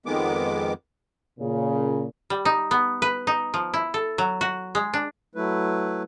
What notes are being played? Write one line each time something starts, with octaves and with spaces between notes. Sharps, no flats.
F2 D#3 G#3 B3 D6
A#2 C#3
G3
D#4
B3
B4
D#4
F3
E4
A4
F#3
F#4
G#3
D4
F#3 A3 E4 B4